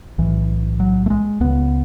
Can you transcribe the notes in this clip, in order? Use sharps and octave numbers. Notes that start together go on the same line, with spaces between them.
B1 A2 E3
F#3
A3
G#3
C#2 C#3 B3